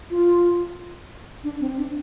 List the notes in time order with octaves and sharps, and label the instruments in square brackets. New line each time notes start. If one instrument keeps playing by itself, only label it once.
[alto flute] F4
D4
C4
D4